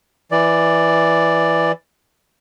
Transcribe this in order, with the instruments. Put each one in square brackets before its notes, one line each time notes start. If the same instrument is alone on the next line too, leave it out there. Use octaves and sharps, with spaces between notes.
[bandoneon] E3 D5